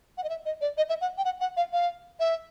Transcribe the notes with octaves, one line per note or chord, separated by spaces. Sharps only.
F#5
D#5
E5
D#5
D5
D#5
E5
F#5
G5
F#5
F#5
F5
F5
E5